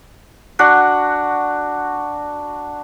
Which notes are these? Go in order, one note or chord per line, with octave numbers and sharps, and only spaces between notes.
D4 F#4 F#5